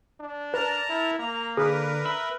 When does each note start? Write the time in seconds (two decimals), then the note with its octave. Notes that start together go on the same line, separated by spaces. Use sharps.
0.20 D4
0.54 A#4 B4 A5 A#5
0.89 E4
1.19 A#3 A#5
1.57 D3 G#4 A#4 B4
2.05 E5 B5